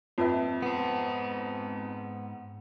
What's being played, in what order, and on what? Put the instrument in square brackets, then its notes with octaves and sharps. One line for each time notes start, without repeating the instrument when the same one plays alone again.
[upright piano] F2 [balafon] F4 B4 E5
[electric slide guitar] G#2 C5 [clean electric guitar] B3